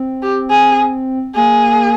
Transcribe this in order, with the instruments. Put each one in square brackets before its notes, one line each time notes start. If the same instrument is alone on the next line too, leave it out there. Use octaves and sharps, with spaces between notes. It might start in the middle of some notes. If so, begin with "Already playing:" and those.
Already playing: [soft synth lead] C4
[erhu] G4
G#4
[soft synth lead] A#3 [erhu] G#4